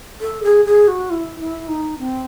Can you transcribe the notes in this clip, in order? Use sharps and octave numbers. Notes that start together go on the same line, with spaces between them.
A4
G#4
G#4
F#4
E4
E4
D#4
C4